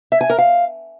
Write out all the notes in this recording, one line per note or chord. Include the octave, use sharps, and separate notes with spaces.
E5
G#5
A#4
F5